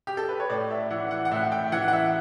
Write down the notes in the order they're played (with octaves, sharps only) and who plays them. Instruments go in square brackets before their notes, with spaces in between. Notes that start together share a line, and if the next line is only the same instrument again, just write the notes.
[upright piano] G4
A4
B4
C#5
A2 D5
E5
E3 F#5
F#5
F#5
A2 E5
G5
E3 F#5
F#5
E5